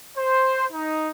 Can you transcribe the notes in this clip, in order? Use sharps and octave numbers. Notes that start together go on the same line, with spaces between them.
C5
D#4